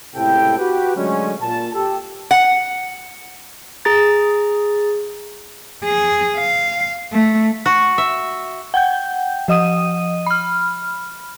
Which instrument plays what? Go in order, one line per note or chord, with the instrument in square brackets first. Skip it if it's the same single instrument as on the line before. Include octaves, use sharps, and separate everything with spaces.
[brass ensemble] C#2 A2 C3 E4 A4 G5
F#4 G4 B4
D3 F#3 G#3 A3 C#4
A#2 A5
G4 A4
[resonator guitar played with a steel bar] F#5
[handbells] G#4 A#5 A6
[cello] G#4
F5
A3
[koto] F#4
E5
[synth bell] F#5 G5 G6
F3 D#5 D#6 D#7
B5 F6